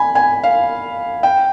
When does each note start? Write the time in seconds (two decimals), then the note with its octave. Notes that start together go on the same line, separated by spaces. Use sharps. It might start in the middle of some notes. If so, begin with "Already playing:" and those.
Already playing: G#5 B5
0.15 G#5
0.43 F5
1.23 G5